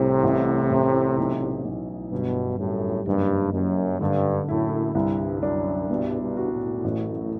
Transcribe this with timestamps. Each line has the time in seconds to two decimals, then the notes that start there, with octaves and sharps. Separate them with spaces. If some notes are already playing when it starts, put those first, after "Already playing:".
Already playing: C2 A2 C3
0.23 A1
0.70 A1
1.17 B1
1.65 B1
2.11 G1 G2 B2
2.59 F#2 A2 G3
3.06 F#1 G2
3.53 F#1 F#2
4.00 G2 D3
4.48 F#2 A2 E4
4.95 C2 G2
5.42 F#2 D4
5.89 G2 B2
6.21 G2
6.37 F#4
6.52 F#2 A2
6.84 A1